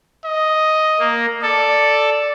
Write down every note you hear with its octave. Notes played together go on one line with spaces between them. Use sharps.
D#5
A#3
A4 D5